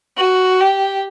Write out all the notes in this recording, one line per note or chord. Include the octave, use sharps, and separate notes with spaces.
F#4
G4